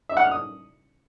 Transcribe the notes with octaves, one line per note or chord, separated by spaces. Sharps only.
E5
F#5
F6
D#6